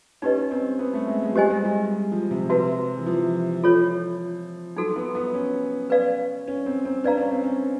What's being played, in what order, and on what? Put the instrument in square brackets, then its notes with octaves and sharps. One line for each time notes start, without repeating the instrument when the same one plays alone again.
[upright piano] C#4 [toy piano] D#4 G4 B4 D#5
[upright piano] C4
B3
A3
G#3
G#3
F#3
[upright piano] G3 [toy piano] G4 C5 D#5 G#5
[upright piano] G#3
G3
F3
C3
[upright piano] C3 [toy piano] F#4 B4 E5 A5
[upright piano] E3
F3
[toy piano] F4 A4 C#5
[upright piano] F#3 [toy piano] D#4 F#4 A4
[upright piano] B3
B3
C#4
[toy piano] B4 D5 F5
[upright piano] C#4
C4
C4
[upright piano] D4 [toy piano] B4 D5 F5 A#5
[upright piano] C#4
C4
C#4